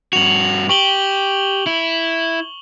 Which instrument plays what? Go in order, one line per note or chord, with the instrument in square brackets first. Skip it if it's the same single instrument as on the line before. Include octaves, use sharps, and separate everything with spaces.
[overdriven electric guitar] G2 F#4 [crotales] F7 F#7
[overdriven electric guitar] G4 [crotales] C#6 F#7 G7
[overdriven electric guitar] E4